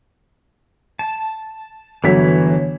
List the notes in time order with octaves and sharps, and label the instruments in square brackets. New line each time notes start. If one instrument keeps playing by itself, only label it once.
[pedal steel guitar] A5
[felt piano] G1 F#3 B6 [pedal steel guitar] E3 C#5